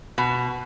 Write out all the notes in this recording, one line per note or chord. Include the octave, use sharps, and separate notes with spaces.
B2